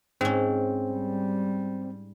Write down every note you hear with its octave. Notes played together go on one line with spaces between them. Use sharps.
G#2 C4 C#4
G3